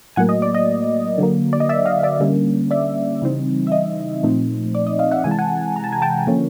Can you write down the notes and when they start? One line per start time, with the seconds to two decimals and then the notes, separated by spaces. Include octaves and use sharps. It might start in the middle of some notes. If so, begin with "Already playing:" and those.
0.16 A2 F#3 A#3 F#5 G#5
0.29 D#5
0.42 D5
0.55 D#5
1.18 D3 F#3 A#3
1.53 D5
1.60 D#5
1.69 D5 E5
1.85 D#5 F5
2.03 D5 E5
2.20 D3 G3 A#3 C#4
2.71 D5 E5
3.22 C#3 E3 G3 C4 D#4
3.67 E5
3.72 D#5
4.23 A#2 F3 A3 C4 D#4
4.75 D5
4.87 D#5
4.99 D#5 F5
5.11 E5 F#5
5.24 C3 E3 G#3 G#5
5.31 A5
5.39 F#5 G#5
5.76 A#5
5.84 A5
5.92 G#5
6.02 G5 A5
6.27 D3 F3 A#3 C#4